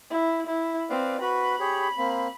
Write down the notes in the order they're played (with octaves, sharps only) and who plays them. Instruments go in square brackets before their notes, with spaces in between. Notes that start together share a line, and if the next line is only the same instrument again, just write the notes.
[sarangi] E4
E4
[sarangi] C4 [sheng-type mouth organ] B4 D5 F5
[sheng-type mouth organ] F#4 B4 [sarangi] B5
[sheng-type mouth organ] G4 G#4 C#5
A#3 C4